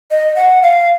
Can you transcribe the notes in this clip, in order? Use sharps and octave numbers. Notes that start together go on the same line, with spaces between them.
D#5
F#5
F5